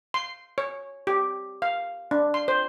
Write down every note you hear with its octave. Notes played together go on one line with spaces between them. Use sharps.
C6
C#5
G4
F5
D4
C6
C5